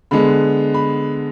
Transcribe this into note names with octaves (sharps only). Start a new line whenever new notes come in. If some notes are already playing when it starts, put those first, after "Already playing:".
D3 G#3 B3 B5
B5